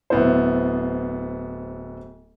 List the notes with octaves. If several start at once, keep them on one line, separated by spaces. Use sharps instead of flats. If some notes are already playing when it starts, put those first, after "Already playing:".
D1 B3 E4 C5